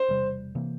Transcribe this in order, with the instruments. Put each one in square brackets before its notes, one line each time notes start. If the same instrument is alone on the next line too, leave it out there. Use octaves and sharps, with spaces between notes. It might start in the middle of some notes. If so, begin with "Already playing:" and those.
Already playing: [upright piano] C5
[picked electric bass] E1 E2 C3 G3
C3 E3 A#3